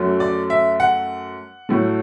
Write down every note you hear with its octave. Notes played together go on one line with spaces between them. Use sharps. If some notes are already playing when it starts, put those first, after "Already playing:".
Already playing: F#2 F#3 A3
D5
E5
F#5
A2 F#3 A3